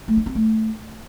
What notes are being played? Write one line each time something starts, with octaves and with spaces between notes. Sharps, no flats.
A3
D4
C4
A3